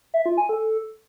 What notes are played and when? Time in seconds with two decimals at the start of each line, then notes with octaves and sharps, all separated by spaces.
0.14 E5
0.26 F4
0.37 G#5
0.49 A4